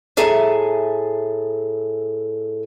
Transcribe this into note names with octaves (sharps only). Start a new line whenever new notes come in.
A2 G#4 A4 E5 G#5 A#5